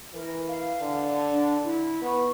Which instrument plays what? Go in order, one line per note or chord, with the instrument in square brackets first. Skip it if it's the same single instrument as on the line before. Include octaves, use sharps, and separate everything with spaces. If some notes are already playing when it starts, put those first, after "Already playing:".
[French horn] E3 [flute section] A#4
[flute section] F5
[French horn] D3
[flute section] D4
E4
[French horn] B3 [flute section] C#6